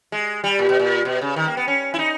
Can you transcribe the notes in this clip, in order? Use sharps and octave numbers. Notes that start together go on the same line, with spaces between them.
G#3
G3
A#2
B2
A#2
B2
C#3
D#3
A#3
B3
C#4
E4
D#4